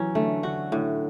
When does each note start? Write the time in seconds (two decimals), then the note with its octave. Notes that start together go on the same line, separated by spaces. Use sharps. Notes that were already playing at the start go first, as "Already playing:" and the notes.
Already playing: E3 F#3 C#4
0.15 D3 A3
0.43 D3 F#4
0.72 A2 D3